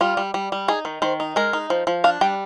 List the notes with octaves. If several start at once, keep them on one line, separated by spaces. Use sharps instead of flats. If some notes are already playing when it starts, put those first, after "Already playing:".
G3 F4
G3
G3
G3
D#4 G#4
D#3
D#3 C5
D#4
G#3 A#4
D#4
F3
F3
D4 F5
G3 G5